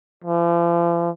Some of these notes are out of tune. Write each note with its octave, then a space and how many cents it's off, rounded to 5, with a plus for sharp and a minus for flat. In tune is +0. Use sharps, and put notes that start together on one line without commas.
F3 -40